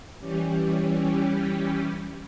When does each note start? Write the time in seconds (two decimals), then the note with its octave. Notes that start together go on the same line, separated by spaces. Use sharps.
0.19 E3 G3 C#4 G4